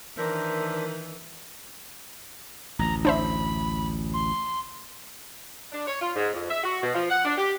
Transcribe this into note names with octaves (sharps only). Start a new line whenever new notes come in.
D#3 E3 D4 A#4 C5 E5
A1 D2 A#5
D4 C5 E5 B5
C6
D4
C#5
F4
G#2
F2
E5
F#4
B2
F3
F#5
D4
G4